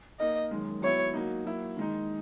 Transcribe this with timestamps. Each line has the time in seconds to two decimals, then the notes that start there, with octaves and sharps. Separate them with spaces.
0.19 A#3 D#4 A#4 D#5
0.51 F#2 D#3 G#3
0.82 F#3 B3 E4 C#5
1.14 F#3 A#3 D#4
1.46 F#3 A#3 E4
1.77 D#3 G#3 D#4